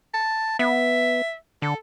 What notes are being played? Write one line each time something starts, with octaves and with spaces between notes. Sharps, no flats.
A5
B3 E5
D3 A4